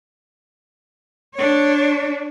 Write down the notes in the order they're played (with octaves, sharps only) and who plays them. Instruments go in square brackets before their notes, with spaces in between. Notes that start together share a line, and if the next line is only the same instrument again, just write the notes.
[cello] D4 C#5